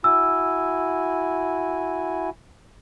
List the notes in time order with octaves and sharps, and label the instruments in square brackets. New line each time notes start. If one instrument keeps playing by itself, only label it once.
[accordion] E4 F#4 G#5 [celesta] E6